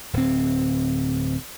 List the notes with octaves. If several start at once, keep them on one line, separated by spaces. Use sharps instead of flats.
D1 C4